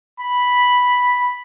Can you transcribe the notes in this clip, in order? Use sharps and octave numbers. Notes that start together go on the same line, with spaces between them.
B5